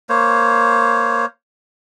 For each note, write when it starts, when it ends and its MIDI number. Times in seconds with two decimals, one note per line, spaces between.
0.09 1.25 58
0.09 1.25 72
0.09 1.25 73